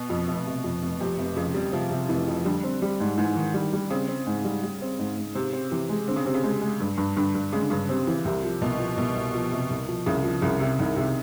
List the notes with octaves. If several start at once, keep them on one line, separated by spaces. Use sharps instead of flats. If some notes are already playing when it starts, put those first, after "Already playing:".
Already playing: B2
F2
F1
C3
F2
F1
F2 C3
F1
F2 C#3
F1 G3
C3 F3
C3
F1 E3
F2
D3 G3
C4
G3
G#2
G#2 E3
D#3
G3
G3
C#3 C4
C4
G#2
G3
G3
C4
G#2
G#2
C3 C4
C4
C3 E3
G#3
D3 C4
C#3
C3 C4
C#3
C3 G#3
G#3
G2
G2
G2 D3
G2
C#3 G#3
D3
G2 C#3
C3 C4
E3
C2 C3
F3
C2 B2
F3
C2 B2
C2
F3
C3
C2
F3
C2 C#3
F3
C2 C#3
C3
C2 D#3
C3